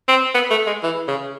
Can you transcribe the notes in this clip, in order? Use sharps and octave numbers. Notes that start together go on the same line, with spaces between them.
C4
B3
A3
G#3
E3
C#3